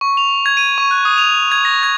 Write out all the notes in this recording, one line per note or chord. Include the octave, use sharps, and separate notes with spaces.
C#6
F7
F7
G#6
D#7
C#6
F#6
D#6
F7
G#6
A#6
G#6